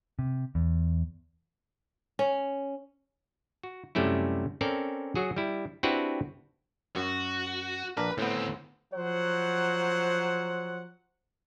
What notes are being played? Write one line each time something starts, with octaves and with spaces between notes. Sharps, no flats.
C3
E2
C#4
F#4
F#2 C3 G3 A3 C#4 E4
C4 C#4 A4 A#4 D5
F#3 F#4 G#4
G3 E4
C4 D4 E4 F#4 G4 B4
F#2 F#4
A#1 D4 A#4 B4
D2 A2 B3 C4
F3 F#3 C5 F#5